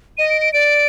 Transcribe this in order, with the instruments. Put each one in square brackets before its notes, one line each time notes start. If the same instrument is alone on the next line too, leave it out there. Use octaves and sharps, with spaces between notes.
[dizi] D#5 [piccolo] D#7
[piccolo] D7
D7
[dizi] D5 [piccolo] D7